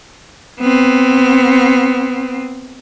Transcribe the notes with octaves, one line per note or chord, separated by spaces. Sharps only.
B3 C4